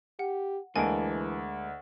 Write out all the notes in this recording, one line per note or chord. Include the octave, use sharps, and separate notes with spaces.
G4 F#5
D2 E3 G#3 A#3 D#5 G#5 A5 D7